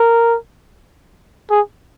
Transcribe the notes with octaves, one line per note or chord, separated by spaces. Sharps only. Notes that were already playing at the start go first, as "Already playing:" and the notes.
Already playing: A#4
G#4